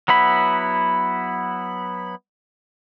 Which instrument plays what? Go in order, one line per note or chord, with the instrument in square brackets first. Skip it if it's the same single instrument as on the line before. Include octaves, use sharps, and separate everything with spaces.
[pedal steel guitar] F#3 B3 E4 B5